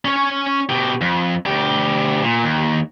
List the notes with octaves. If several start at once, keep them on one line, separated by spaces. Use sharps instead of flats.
C#4 C#5
B2 G4
F2
D2 G4
A#2
D#2